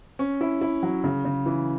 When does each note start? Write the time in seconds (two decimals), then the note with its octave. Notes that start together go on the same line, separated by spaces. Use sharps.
0.19 C#4
0.41 E4
0.61 E4
0.83 F#3
1.04 C#3
1.25 C#3
1.46 E3